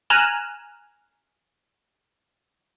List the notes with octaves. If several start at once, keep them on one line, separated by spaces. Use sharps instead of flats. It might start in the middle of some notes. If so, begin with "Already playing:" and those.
G#5 A#5 F6 F#6 D#7 E7